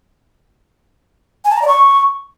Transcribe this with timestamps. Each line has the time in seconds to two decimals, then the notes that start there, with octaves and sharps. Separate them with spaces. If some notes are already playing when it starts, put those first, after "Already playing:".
1.45 G#5
1.50 A5
1.56 A#5
1.62 D5
1.68 C#6